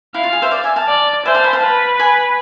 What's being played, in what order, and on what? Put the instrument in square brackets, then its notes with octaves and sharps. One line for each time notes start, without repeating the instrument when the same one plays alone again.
[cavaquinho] E4 [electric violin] F5
[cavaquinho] F4
G#4
C5 E5
D5 F5
E5 G#5
F5 A5
[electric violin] D5
[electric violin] C5 [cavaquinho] E5 G#5
[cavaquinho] F5 A5
G#5 B5
F5 A5
[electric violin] B4
[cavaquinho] G#5 B5